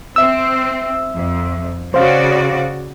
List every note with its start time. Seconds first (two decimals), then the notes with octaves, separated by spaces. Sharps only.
0.16 C4 E5 E6
1.17 F2
1.94 C#3 F#4 C5 D5 F5